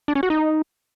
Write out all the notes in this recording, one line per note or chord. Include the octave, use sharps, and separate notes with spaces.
D4
C#4
F#4
D#4